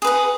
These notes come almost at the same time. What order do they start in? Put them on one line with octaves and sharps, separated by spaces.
G#4 B4 F#5